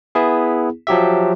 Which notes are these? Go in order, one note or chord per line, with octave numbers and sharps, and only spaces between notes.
B3 E4 G#4
F3 F#3 G4 E5